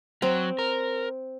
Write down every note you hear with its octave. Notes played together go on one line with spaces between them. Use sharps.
F#3 C4
A#4